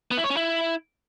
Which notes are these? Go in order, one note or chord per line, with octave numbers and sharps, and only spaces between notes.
B3
E4
C#5
C#4
E4